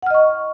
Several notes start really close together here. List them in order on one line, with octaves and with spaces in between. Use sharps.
F#5 F6 D#5 C#6